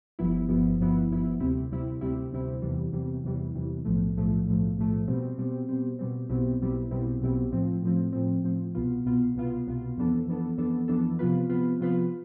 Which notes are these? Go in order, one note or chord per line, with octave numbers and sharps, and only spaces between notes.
G1 G2 F3 B3 E4
G1 G2 F3 B3 E4
G1 G2 F3 B3 E4
G1 G2 F3 B3 E4
D2 C3 G3 C4 E4
D2 C3 G3 C4 E4
D2 C3 G3 C4 E4
D2 C3 G3 C4 E4
E2 C3 E3 G3
E2 C3 E3 G3
E2 C3 E3 G3
E2 C3 E3 G3
B1 A2 F3 A3
B1 A2 F3 A3
B1 A2 F3 A3
B1 A2 F3 A3
B2 G3 C4
B2 G3 C4
B2 G3 C4
B2 G3 C4
B1 B2 G3 C4 E4
B1 B2 G3 C4 E4
B1 B2 G3 C4 E4
B1 B2 G3 C4 E4
A2 F3 C4
A2 F3 C4
A2 F3 C4
A2 F3 C4
C2 B2 B3 F4
C2 B2 B3 F4
C2 B2 B3 F4
C2 B2 B3 F4
F2 E3 B3 D4 A4
F2 E3 B3 D4 A4
F2 E3 B3 D4 A4
F2 E3 B3 D4 A4
C3 F3 B3 F4 B4
C3 F3 B3 F4 B4
C3 F3 B3 F4 B4